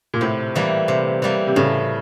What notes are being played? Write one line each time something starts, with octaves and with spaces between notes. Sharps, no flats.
A#2
A2 C3
E3 G3 A#3
C3
E3 G3 A#3
C3
A2 C#3